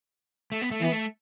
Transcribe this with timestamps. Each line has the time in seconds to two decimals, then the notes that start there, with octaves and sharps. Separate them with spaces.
0.52 A3
0.62 B3
0.71 A3
0.81 E3 B3
0.92 A3